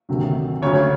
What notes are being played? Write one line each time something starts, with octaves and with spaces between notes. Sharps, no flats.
D2 C3 D#3 F#3
D2 C#3 F#3 C#5